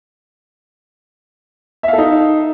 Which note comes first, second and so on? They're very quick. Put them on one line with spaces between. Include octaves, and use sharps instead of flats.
E5 F5 A4 D#4